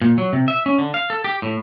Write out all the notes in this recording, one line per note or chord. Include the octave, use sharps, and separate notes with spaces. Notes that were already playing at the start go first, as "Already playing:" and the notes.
A#2
F#3
C3
E5
C#4
D3
F5
A4
G4
A2